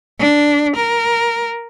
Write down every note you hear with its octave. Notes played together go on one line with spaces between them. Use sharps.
D4
A#4